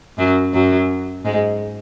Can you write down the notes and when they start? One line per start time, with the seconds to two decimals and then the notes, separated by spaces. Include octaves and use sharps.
0.18 F#2 F#3
0.54 F#2 F#3
1.25 G#2 G#3